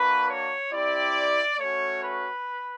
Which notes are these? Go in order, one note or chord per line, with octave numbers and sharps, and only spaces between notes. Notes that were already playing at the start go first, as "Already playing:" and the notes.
Already playing: A#3 D4 F#4 B4
C#5
C4 E4 G4 D5
A3 C#4 F#4 C#5
B4